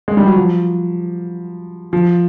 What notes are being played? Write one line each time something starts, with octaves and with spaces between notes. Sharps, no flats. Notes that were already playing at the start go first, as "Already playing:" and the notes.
G#3
G3
F#3
F3
F3